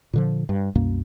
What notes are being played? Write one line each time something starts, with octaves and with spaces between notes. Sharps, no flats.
A#2 D3 F3
G2
C2 F#2 B2 A#3